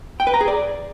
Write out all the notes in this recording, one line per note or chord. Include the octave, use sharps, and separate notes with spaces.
G5
B4
A#5
G#4
D5